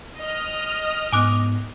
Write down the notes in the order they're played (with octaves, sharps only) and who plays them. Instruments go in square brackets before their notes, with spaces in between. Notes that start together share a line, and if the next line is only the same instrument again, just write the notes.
[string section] D#5 D#6 F6
[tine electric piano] G#2 B3 [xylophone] G#5 D6 F#6